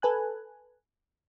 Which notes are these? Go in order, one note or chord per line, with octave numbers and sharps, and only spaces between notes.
A4 B4 G#5 F#6